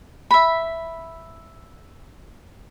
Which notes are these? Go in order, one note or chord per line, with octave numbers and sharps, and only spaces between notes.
E5 B5